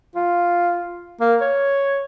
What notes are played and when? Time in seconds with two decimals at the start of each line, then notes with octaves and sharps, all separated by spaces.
0.16 F4
1.20 A#3
1.41 C#5